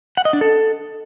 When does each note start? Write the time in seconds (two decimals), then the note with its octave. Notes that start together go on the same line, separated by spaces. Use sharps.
0.17 F#5
0.25 D#5
0.33 D4
0.41 A4